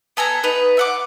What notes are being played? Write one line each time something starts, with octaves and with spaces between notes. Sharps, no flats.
B3 A4 G#5 A#5
B3 D#4 B4
E5 F#5 D6